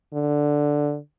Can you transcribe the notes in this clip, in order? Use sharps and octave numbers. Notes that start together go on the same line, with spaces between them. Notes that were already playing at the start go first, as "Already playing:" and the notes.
D3